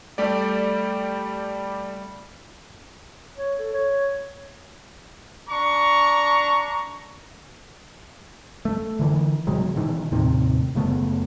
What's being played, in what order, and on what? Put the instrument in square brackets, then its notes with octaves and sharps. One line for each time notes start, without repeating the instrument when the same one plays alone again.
[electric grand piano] G3 A3 G4 D5
[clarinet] C#5
A4
C#5
[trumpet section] D4 A#5 C#6
[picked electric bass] A3
D3 E3
B2 D#3 F#3 G#3
B2 D#3 E3
D#2 A2 C3 D#3
F#1 C#3 A3 B3